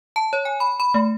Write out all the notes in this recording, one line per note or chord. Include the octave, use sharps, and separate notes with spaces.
A5
C#5
G#5
B5
B5
A3